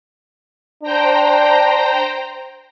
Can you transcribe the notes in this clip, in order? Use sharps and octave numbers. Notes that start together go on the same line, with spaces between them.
D4 C5 G5 A#5